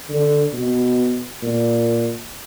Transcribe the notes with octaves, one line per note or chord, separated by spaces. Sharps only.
D3
B2
A#2